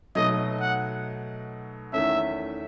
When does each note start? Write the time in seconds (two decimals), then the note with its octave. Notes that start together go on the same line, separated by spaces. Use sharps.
0.15 B2 F#3 A3 D#4 D#5
0.60 F#5
1.93 E2 D#3 A3 C#4 E5